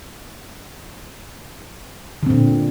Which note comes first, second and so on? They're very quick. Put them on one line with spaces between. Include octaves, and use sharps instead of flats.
D3 C4 A#2